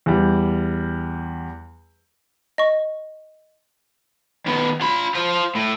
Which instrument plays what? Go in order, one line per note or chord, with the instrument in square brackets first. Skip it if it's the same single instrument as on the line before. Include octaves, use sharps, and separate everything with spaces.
[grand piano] E2 E3 G3
[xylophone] D#5 C#6
[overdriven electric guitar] D#3 B3
F4 B5
F4 C5
A2